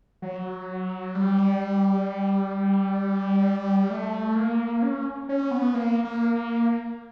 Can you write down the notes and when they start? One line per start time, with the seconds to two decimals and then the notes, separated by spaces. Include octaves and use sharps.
0.22 F#3
1.15 G3
3.91 A3
4.36 A#3
4.82 C#4
5.29 C#4
5.51 B3
5.74 A#3
6.05 A#3
6.36 A#3